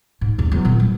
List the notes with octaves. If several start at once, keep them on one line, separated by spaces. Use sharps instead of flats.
G#2
D#2 C#3
E2 F#3
A#2 D#3
G3